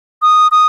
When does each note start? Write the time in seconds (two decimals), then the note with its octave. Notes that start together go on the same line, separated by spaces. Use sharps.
0.22 D#6
0.52 D#6